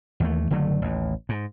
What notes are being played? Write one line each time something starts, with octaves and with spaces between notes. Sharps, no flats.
D#2 E3 A3
F#1 D3 F#3 A3
A1 D#2
G#2